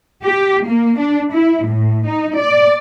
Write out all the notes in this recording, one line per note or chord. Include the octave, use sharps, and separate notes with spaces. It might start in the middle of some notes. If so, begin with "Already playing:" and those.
G4
A#3
D4
E4
A2
D#4
D5